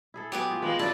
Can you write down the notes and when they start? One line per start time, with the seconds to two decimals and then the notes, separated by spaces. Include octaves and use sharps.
0.14 E4 G#4 A4
0.32 F#3 B3 G4 G#4 D6
0.51 F4 G5
0.62 F3 G#3 A#3 B4
0.79 A2 C#3 F#3 E4 D5 A5